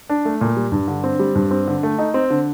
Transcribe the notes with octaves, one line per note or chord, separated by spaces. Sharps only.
D4
A3
A#2
G3
G2
D3
C4
G3
G2
C4
D3
A3
D#4
C4
D3